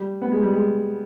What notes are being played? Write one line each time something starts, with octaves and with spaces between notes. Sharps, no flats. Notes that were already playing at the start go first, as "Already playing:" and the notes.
Already playing: G3
B3
G#3
G3
G#3